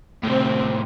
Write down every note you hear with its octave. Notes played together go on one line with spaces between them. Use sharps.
A2 C3 C4